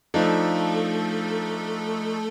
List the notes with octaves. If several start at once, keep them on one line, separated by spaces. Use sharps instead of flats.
F3 A3 D4 D#4 A4